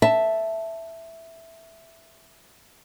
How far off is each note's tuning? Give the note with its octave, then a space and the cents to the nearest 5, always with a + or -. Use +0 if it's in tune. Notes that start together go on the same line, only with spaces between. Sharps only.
E5 +0 A5 +0